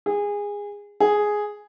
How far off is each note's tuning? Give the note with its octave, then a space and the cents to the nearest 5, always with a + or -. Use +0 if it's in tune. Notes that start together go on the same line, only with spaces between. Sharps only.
G#4 -20
G#4 +5